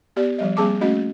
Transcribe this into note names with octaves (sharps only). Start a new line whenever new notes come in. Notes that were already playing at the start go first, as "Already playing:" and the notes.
B3 G4 D5
F3 G3 D#5
G3 A#3 C4 G#4 A5 D6
A3 A#3 C#4 F#4 D#5